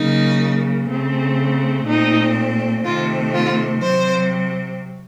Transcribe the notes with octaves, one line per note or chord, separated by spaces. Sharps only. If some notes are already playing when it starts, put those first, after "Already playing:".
Already playing: C#3 F#3 A#3 D#4
C#3 A3 C4
A#2 A3 C4 D#4
C3 D#3 A3 C4 F4
F4
C3 F#3 C4 C5